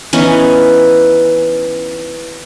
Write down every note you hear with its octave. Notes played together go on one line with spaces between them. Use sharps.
E3 B3 C#4 D#4